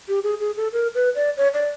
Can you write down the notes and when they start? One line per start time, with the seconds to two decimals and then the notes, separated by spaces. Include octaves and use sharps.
0.08 G4
0.24 G#4
0.40 G#4
0.57 A4
0.73 A#4
0.95 B4
1.15 D5
1.37 C#5
1.54 D5